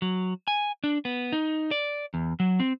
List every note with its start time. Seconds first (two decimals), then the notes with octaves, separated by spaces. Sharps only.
0.02 F#3
0.48 G#5
0.84 D4
1.05 B3
1.32 D#4
1.71 D5
2.14 E2
2.40 F#3
2.60 C4